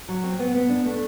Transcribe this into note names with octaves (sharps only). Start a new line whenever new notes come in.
F#3
C4
B3
B3
D4
A3